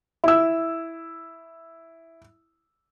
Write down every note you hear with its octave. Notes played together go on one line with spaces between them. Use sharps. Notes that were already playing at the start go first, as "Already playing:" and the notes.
E4 E6